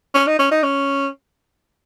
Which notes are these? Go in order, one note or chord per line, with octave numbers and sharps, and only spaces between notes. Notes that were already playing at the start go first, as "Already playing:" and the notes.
C#4
D#4
C#4
D#4
C#4